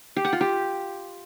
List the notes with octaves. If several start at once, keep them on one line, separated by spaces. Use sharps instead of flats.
G4
F#5
F4
G4